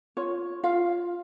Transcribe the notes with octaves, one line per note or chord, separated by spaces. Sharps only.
F4 C#5
F4 F5